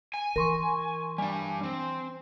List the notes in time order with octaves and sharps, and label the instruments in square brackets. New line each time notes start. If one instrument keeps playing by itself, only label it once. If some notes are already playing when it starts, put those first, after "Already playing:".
[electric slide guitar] G#5
[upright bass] E3 [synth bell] A#4 C6 C#6
[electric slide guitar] G3 D4 [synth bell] G#5
[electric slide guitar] C4